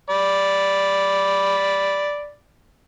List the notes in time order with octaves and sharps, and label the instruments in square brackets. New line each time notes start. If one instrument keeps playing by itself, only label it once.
[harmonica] D5 B5